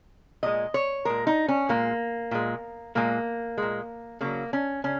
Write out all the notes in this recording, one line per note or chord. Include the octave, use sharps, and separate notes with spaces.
A#2 G#3 D#5
C#5
A#2 G#3 A#4
D#4
C#4
A#2 G#3 A#3
A#2 G#3
A#2 G#3 A#3
A#2 G#3
C#3 F#3 A#3
C#4
C#3 C#4